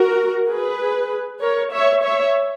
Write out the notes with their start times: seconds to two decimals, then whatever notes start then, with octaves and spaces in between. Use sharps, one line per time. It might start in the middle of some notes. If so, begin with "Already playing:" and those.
Already playing: F#4 A#4
0.49 G#4 B4
1.42 A#4 C#5
1.73 C#5 E5
2.03 C#5 E5